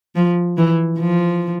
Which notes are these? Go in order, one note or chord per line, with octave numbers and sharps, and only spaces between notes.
F3
E3
F3